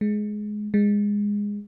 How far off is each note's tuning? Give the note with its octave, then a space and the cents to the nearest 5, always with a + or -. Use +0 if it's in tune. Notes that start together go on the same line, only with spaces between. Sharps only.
G#3 +15
G#3 -15